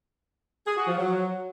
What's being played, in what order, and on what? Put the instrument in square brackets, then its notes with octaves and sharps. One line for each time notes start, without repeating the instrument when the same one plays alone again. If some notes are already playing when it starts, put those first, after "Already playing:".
[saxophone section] G#4
F#4
F3
F#3